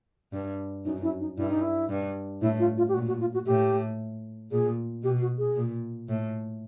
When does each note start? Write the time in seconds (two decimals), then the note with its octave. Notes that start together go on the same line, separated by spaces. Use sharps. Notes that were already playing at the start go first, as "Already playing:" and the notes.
0.33 G2
0.85 F#2 D#4
1.03 E4
1.20 D#4
1.37 G2 E4
1.50 D#4
1.61 E4
1.90 G2
2.42 A2 E4
2.59 F4
2.78 F4
2.89 G4
2.94 A#2 F#4
3.08 F#4
3.21 F4
3.34 F#4
3.46 A2 G4
4.51 A#2 G#4
5.03 B2 G4
5.21 F#4
5.38 G#4
5.56 A#2
6.09 A2